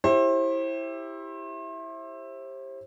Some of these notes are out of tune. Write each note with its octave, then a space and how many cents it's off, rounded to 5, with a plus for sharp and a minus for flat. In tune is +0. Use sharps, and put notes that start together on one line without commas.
E4 +0 G4 +5 C5 +35